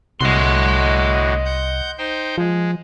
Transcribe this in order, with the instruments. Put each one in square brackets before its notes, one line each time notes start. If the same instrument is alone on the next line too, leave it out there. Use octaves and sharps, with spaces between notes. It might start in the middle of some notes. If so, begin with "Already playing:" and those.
[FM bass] C2 [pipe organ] A2 D3 F#4 [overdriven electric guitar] D#5 C6
[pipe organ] F#5 G6
D#4 C5 G5
[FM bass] F3 [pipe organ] G#3